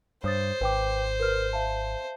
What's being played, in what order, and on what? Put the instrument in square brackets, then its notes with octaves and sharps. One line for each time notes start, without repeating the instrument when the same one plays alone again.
[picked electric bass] G2 [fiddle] C5 [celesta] C#5 D#6 A6
[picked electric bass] G#1 [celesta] B4 G5 D6
[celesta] A#4 B4 F6
E5 F5 A5